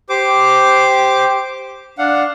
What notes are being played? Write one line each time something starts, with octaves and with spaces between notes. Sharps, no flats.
G4 C5 D6
D4 F5 F#5